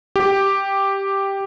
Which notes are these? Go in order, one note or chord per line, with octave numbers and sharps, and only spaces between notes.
G4